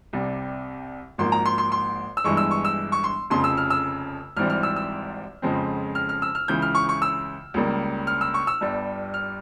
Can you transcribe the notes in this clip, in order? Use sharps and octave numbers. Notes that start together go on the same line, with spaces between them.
C2 C3 G3
G#1 G#2 F3 A#3 C6
A#5
C6
C6
C6
E6
G1 G2 E3 G#3 C#6
E6
C#6
E6
C#6
C6
F1 F2 C#3 C6
E6
F6
E6
G#1 G#2 E3 G3 C4 F6
F6
E6
E6
F2 C#3 F3 G#3 C4
F6
F6
E6
F6
C#2 C#3 E3 G6
F6
C#6
C#6
E6
C#2 C#3 G3 A#3
F6
E6
C#6
E6
G1 G2 G3
F6